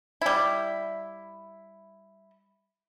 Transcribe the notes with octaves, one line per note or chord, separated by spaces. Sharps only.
G3 E4